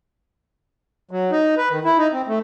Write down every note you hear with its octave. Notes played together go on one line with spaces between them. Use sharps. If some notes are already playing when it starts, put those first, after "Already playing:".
F#3
D#4
B4
D#3
E4
D#4
C4
A3